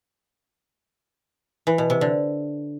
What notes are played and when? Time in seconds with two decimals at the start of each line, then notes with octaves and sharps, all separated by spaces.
1.67 E3
1.78 B2
1.90 C3
2.01 D3